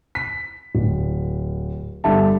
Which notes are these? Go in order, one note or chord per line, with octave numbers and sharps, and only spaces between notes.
B6
D1
G1 D3 G3 A4 E5 A5